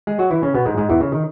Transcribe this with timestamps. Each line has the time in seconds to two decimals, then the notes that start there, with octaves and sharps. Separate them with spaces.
0.07 G#3 G#4
0.19 F#3 F#4
0.31 E3 E4
0.43 C#3 C#4
0.55 B2 B3
0.65 G#2 G#3
0.77 G#2 G#3
0.90 E2 E3
1.01 C#3
1.12 D#3